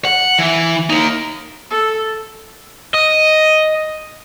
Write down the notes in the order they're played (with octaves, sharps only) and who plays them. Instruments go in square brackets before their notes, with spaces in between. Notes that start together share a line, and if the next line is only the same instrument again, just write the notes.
[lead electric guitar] F#5
E3
A#3 D#4
[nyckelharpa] A4
[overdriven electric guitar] D#5